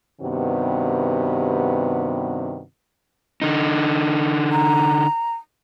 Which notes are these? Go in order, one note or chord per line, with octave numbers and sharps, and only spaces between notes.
G2 C3 D#3 B3 F#4
D3 D#4
A#5